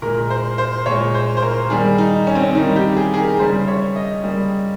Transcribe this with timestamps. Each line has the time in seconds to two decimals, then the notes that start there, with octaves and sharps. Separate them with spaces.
0.02 A#2 G#3 A#4
0.30 C5
0.58 C5
0.86 A#2 G#3 C#5
1.14 C5
1.37 C5
1.42 A#4
1.70 D#3 G3 A#3 G#4
1.98 D#4
2.27 C#4
2.35 C4
2.43 C#4
2.55 D#3 G3 A#3 D#4
2.76 G4
2.97 G#4
3.14 G#4
3.18 A#4
3.39 C#3 G3 A#3 C5
3.67 C#5
3.96 D#5
4.23 C#3 G3 A#3